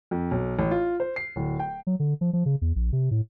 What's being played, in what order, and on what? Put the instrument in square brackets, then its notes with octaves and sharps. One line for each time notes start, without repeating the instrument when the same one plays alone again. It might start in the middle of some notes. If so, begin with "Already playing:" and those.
[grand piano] F2
B1
A1
F4
C5
C7
D1
G5
[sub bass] F#3
D3
F3
F3
C#3
E2
A#1
C3
A2